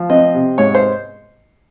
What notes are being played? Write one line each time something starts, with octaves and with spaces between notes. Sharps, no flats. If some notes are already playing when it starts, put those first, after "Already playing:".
Already playing: F3
C4 D#5
C3
G#2 C#5
C5